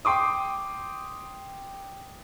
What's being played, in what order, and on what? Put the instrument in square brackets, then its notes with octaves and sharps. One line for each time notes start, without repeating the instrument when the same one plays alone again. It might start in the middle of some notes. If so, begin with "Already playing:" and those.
[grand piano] G5 C6 D6 D#6